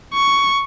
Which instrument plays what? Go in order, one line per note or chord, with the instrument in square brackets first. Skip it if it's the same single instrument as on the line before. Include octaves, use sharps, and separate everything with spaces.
[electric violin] C#6